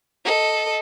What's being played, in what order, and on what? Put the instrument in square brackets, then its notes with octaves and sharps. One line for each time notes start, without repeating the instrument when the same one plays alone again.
[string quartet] A4 D#5